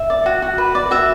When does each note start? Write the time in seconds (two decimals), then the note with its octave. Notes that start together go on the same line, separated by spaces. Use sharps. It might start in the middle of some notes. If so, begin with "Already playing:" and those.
Already playing: E5
0.10 D5
0.26 F#4
0.42 F#4
0.58 B4
0.75 D5
0.91 F#4 E5